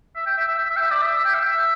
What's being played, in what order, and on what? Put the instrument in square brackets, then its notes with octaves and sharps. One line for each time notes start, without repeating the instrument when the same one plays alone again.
[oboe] E5
G5
E5
E5
E5
E5
G5
E5
D5
E5
E5
G5
E5
E5